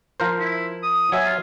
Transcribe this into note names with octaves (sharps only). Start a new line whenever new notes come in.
F3 A#4 C5
E4
D#6
F#3 E5 G#5
F4